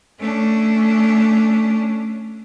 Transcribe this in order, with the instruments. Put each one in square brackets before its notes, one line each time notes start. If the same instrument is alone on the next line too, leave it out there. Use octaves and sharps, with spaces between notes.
[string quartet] A3 C#4 D4